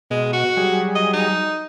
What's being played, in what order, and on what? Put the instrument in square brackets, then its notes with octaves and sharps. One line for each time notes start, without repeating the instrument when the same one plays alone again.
[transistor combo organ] B2 [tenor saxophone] G#3
[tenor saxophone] F#4
[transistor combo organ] F#3 G3 G#4
[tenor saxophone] D#5
D#4